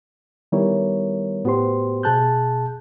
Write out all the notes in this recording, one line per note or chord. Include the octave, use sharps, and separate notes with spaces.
D#3 G3 B3 E4 A#4 C#5
A2 B3 F#4 G4 C5 C6
B2 G#4 A5 F#6 G6